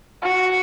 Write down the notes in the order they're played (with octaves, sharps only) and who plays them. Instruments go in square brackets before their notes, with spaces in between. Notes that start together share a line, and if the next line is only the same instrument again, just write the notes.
[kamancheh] F#4